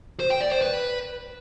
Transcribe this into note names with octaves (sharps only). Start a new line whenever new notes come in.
C5
G5
D5
C5
B4